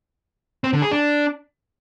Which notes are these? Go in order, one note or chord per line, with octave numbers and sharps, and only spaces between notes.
C4
D3
G#4
D4